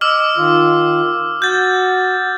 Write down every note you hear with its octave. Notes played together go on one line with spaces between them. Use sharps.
D#5 D6 E6 F6
D#3 F4
F#4 G6 A6